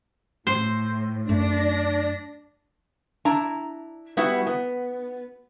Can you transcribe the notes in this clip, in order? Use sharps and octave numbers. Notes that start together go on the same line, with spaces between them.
A2 C5
F#2 A3 D4 A#6
D4 E4 A#5
G3 B3 E4 F#4
B3